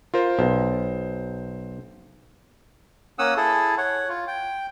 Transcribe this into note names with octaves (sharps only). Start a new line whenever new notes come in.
F4 A#4 C5
B1 C5
A#3 C#4 F#5 D#6 E6
E4 G#4 A4
C#5 F#5
F4
G5